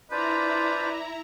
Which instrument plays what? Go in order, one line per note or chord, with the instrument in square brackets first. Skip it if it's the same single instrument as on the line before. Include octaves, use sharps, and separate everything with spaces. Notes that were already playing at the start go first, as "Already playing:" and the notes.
[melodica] D4 F4 C5 [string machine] E4 A#5 [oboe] B4 [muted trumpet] D5